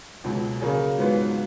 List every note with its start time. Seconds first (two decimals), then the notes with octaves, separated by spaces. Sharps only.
0.24 C#2 B2 F#3
0.61 C#3 F#3 A#3 C#4 G#4
0.98 G#2 F#3 B3 F4